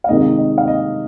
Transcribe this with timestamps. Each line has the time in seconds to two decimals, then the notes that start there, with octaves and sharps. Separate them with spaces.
0.04 F5
0.09 C3 D#3 G#3 D#5
0.38 D#5
0.58 F5
0.68 D#5